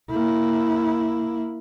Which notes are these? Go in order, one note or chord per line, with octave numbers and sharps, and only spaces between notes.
A#3 E4